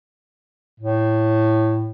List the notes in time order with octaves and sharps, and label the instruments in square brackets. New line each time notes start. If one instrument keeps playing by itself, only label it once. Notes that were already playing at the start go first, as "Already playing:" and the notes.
[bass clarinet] A2